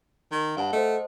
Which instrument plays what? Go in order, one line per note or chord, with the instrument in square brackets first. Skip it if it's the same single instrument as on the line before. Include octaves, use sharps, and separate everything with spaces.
[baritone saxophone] D#3
[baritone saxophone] G2 [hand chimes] F5 F#5 A5
[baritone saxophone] A3 [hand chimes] C5 D#5